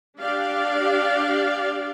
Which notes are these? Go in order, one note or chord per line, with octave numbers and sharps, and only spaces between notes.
D4 G4 D5 F5